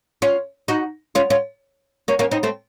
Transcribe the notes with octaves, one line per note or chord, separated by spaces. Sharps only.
C#4 F4
D#4 F#4
C#4 F4
C#4 F4
A#3 C#4
A#3 C#4
C4 D#4
A3 C4